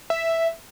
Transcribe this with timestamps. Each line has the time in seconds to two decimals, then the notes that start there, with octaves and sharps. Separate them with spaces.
0.10 E5